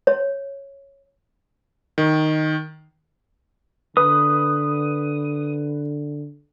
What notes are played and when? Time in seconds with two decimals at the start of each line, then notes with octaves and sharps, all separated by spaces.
0.07 C#5
1.98 D#3
3.97 D3 B4 D#6